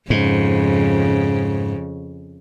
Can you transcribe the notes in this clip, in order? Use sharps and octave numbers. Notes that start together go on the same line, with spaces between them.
F2 G#2 C#3